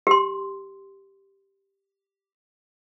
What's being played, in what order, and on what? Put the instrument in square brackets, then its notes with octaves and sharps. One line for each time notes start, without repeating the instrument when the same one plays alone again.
[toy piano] G4 C6